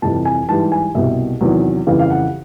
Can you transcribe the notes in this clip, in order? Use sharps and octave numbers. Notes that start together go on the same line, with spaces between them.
F2 C3 E3 G3 A5
G#5
G#2 E3 G3 A5
G#5
C2 B2 G3 E5
E2 C3 D#3 F#3
F2 C#3 E3 G3 F5
F5
F#5